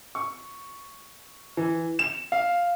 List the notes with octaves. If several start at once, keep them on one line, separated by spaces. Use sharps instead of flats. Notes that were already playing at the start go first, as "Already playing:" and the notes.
C#6
E3
E7
F5